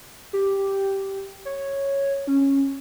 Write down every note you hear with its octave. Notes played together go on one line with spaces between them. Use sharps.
G4
C#5
C#4